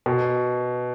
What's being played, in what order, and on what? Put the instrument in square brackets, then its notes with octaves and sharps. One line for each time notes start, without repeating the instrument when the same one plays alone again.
[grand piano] B2